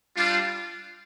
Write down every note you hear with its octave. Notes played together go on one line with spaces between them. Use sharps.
G3 D4 F4